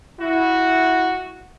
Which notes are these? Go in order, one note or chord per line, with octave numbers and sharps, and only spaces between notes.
E4 F#4